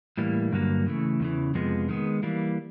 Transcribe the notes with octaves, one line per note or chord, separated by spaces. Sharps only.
A2 E3 G3 A#3
G2 D3 F#3 A#3
C#3 E3 A3
E2 C#3 E3
F2 C3 F3 G#3 B3
D#3 G#3 B3
E3 G3 A#3